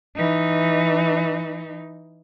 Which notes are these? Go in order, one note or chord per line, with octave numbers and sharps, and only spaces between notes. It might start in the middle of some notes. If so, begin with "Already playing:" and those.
E3 D#4